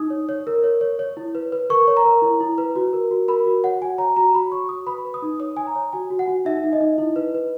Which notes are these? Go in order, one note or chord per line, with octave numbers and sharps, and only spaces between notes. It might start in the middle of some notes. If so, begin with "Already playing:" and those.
Already playing: D#4 D#6
C#5
C#5
A#4
C#5
C#5
C#5
E4
B4
B4
A#4 C#6
C#5
A#5
A#4
E4
E4
B4
F#4
A#4
F#4
A#4 B5
F#4
C#5 F#5
F#4 G#5
C#5 A#5
F#4 A#5
F#4 B5
C#5 C#6
F#4 D#6
B4 B5
B4
D#6
D#4
C#5 D#6
C#5 G#5
A#5
C#5
F#4 G#5
F#4
F#5
F#4
D#4 E5
D#4
D#5
D#4
E4
B4
B4